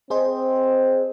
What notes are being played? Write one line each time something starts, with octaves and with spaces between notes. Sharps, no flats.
C4 G#4 C5 D#5